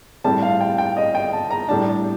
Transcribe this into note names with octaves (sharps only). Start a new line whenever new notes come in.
A2 G3 C4 A5
F5
G5
G5
D#5
G5
A5
A#5
A2 G3 D4 A5